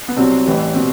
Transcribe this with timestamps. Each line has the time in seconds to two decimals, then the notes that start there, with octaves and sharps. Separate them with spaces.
0.09 B3
0.17 C2 C3 F#3 C4
0.46 A1 A2 E3 G3
0.74 B2 G3 C4